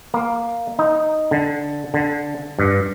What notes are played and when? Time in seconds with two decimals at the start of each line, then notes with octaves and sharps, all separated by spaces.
0.14 A#3
0.79 D#4
1.31 D3
1.94 D3
2.59 G2